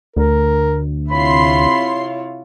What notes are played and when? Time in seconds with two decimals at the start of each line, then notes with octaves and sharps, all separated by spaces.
0.16 D2 A#4
1.10 C3 E4 F4 C#5 B5 C6 C7